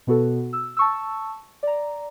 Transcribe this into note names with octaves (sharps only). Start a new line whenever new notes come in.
B2 B3 F#4 A4
E6
A5 C#6 E6
D5 A#5